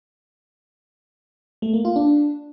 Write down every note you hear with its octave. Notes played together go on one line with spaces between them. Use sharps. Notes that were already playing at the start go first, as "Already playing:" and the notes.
A3
A#3
F4
D4